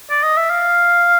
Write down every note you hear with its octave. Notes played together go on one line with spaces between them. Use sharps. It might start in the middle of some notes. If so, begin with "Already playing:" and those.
D5
D#5
E5
F5